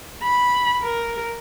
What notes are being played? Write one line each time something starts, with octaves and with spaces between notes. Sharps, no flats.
B5
A#4